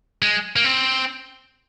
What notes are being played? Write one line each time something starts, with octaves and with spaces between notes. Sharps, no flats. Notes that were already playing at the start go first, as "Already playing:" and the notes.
G#3
A#3
C4